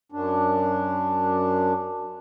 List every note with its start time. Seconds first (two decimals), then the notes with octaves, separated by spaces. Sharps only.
0.12 F#2 D4